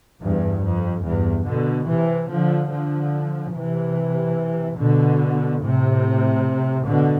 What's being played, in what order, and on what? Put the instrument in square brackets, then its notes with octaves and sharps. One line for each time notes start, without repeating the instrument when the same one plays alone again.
[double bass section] E2 G2
F2
E2 G2
B2 D3
C3 E3
D3 F3
D3 F3
C3 E3
B2 D3
A2 C3
B2 D3